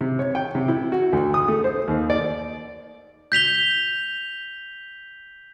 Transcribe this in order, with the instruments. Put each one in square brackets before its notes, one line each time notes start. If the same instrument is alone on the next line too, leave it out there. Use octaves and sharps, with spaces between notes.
[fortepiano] C3
C#5
G5
C3
E4
F#4
D2
D#6
A3
C5
D#2
D5
[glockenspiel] G6 B6 F7 G7